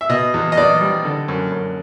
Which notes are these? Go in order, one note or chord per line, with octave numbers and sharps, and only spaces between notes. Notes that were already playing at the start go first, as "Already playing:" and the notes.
E5
B2 D#5
E2
D#5
E2 D5
G3
D3
F#2
F#2